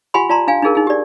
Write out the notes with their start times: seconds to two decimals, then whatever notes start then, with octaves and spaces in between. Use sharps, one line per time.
0.14 F4 G4 F#5 G#5 B5 C6
0.29 F4 D5 A5 A#5 C6
0.48 D4 F5 G#5
0.62 D4 D#4 G#4 A#4
0.75 D#4 G#4
0.87 G4 D5